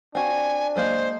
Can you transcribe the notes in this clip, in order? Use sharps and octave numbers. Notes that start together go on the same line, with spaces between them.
C4 D4 F#4 G#5
F#3 G#3 A#3 C5